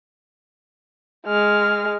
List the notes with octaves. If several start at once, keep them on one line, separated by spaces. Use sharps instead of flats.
G#3 F6